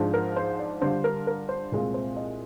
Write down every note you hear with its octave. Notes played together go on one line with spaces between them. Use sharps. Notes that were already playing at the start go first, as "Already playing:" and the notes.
Already playing: G#2 F3 G#3 D4 F4
A#4
C5
D5
D3 G3 D4 F4 C5
A#4
A#4
C5
C2 A#2 G#3 C4 F4
C5
D#5